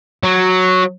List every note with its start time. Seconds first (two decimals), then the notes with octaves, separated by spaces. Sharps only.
0.24 F#3